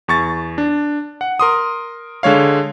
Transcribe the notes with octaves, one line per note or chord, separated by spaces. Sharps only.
E2 C#6 A6
D4
F#5
A#4 C6 D#6
D3 G#3 C#5 F5